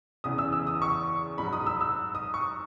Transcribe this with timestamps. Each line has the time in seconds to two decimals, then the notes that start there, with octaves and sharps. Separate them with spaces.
0.24 E2 C#3 E3 D#6
0.38 E6
0.53 E6
0.67 D#6
0.82 C#6
1.38 G#2 F#3 B5
1.53 D#6
1.66 E6
1.81 E6
2.15 D#6
2.34 C#6